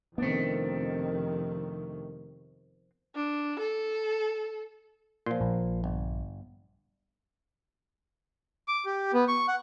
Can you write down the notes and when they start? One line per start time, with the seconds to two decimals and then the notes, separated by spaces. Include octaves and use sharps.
0.18 F2 C3 D#3 A3 B3 C4 D4
3.16 D4
3.59 A4
5.26 A#2 F3 C6
5.41 A#1
5.84 G1
8.68 D6
8.86 G4
9.13 B3
9.28 C#6
9.48 F#5